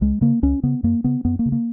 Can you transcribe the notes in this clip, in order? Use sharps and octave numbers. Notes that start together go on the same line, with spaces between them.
C#2 G#3
C#3 A#3
C#2 C#4
C#3 B3
F#2 A#3
C#3 B3
F#2 B3
A#3
C#3
A#3